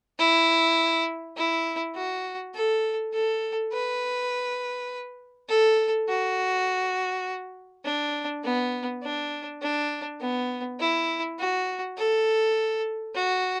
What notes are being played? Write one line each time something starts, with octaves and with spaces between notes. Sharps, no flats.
E4
E4
F#4
A4
A4
B4
A4
F#4
D4
B3
D4
D4
B3
E4
F#4
A4
F#4